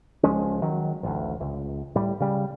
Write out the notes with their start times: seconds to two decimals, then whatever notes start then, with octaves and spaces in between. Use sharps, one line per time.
0.23 C#2 F3 G#3 C#4
0.62 D#3 F#3
1.03 A1 D2
1.40 C#2
1.95 A2 G3
2.20 C#3 G3